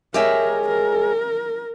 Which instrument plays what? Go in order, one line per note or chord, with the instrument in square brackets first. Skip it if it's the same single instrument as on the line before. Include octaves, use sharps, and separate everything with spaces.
[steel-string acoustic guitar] G#3 G#4 C#5 [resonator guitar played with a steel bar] G4 E5 [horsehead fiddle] A#4
[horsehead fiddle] A#4